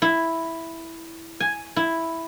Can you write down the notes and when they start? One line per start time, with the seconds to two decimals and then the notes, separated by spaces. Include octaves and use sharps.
0.02 E4
1.40 G#5
1.76 E4